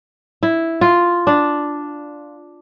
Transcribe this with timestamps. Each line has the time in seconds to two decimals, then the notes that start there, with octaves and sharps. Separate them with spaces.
0.43 E4
0.81 F4
1.27 D4